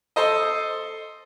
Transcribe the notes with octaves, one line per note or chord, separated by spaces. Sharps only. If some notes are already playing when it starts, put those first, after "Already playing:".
A4 C5 D#5